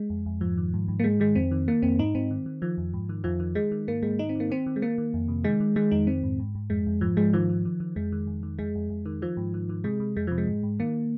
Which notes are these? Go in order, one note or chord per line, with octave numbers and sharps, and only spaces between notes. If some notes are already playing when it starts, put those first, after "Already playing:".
Already playing: G#3
F2
F2
G#2 F3
D#3
G#2
G#2
A#3
G#2 G#3
D#3 G#3
F2 C4
D#3
D#3 A#3
F2 C4
G#2 D#4
G#2 C4
D#3
D#3
D#3 F3
F2
G#2
D#3
F2 F3
D#3
D#3 G#3
D#3
G#2 A#3
G#2 G#3
D#3 D#4
C4
D#3 A#3
D#3 C4
D#3
G#3
D#3 A#3
D#3
F2
C3
D#3 G#3
D#3
D#3 G#3
F2 D#4
D#3 C4
G#2
G#2
G#2
F2 G#3
F2
G#2 F3
G#2 G#3
D#3 F3
D#3
D#3
D#3
F2 G#3
D#3
F2
D#3
F2 G#3
F2
F2
D#3
D#3 F3
G#2
D#3
D#3
C3 G#3
C3
F2 G#3
C3 F3
G#3
G#2
G#2
D#3 A#3